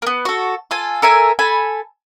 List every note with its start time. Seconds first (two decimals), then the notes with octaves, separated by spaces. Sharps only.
0.02 A#3 B3
0.25 F#4 A4
0.71 F4 A4 G#5
1.02 A4 A#4 E5 G#5
1.39 A4 G#5 B5